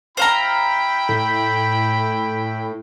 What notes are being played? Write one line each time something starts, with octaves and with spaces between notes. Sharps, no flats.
E4 C5 F5 G5 A#5 B5
A2